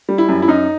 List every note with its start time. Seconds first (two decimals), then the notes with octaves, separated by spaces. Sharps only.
0.09 G3
0.18 E4
0.29 F#2
0.42 E4
0.48 F#2 D#4